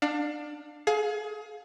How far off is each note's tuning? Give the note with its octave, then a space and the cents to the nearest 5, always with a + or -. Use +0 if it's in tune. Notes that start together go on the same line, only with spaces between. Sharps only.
D4 +20 F5 +35
G#4 +30 F5 +25